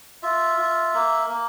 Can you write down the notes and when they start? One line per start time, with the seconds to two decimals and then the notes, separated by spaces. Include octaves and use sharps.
0.23 F4 E5
0.58 F4
0.94 A#3
1.30 A#3